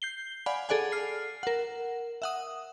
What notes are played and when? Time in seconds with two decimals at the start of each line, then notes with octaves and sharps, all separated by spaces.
0.02 G6 C7 G7
0.46 D5 F5 F#5 G#5 B5
0.69 G#4 A4 D5 F#5 G#5
0.92 F6 C7
1.43 A#4 F#5
2.22 E5 F#5 D#6